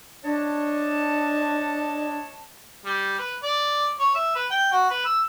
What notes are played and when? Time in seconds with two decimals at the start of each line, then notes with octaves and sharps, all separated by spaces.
0.24 D4 C#5 D#5 A5
2.85 G3
3.19 B4
3.43 D5
3.99 C#5
4.15 E5
4.35 B4
4.51 G5
4.72 F#4
4.90 B4
5.05 E6